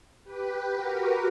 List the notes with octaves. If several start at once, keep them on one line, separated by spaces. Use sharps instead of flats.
G4 B4
F#4 A#4